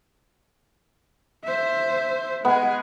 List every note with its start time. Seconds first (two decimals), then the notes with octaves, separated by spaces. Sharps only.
1.44 C5 E5
2.45 G#3 B3 G#4